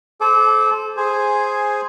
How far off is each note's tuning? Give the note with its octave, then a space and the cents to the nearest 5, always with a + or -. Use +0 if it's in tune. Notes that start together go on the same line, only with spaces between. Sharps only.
A4 -30 C5 +0 D6 +0
G#4 +0 C5 +0 G#5 -5